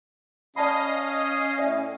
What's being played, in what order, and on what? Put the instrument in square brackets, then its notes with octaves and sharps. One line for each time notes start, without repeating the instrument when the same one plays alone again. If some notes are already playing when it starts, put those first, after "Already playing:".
[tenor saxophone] C#4 [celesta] D5 A5 B5 [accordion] D#5 F5 D#6
[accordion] A2 [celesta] D5 E5